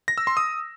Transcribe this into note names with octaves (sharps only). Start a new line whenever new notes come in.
A#6
E6
C6
D#6